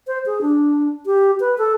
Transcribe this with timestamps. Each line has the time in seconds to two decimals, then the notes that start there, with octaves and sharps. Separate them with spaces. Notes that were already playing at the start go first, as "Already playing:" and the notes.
0.07 C5
0.26 G#4
0.41 D4
1.06 G4
1.40 B4
1.58 A4